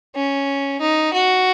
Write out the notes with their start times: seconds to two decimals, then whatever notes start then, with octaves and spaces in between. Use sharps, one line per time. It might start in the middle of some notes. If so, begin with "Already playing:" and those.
0.15 C#4
0.81 D#4
1.14 F#4